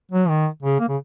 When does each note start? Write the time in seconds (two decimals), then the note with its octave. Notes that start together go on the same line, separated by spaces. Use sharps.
0.11 F#3
0.29 D#3
0.63 C#3
0.80 A#3
0.89 C#3